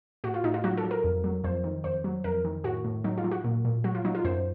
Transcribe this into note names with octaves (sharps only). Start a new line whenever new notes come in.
A2 F#4
F4
A2 D#4
F4
F#3 F#4
A4
F#3
A#4
F2
F#3
F2 C5
D#3
F2 C5
F#3
F2 A#4
D#3
A2 F#4
A2
F#3 D#4
F4
F#3
F#4
A#2
A#2
F#3 F#4
F4
F#3 D#4
F4
F#2 C5